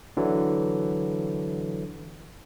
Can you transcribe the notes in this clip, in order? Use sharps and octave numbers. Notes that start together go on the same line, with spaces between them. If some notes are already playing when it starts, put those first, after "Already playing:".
D3 E3 F#3